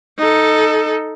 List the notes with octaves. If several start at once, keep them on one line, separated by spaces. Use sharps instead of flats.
D#4 A4